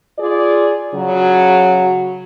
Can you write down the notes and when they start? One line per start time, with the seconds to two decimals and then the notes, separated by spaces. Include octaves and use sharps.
0.19 F4 G#4 D5
0.94 C#3 F#3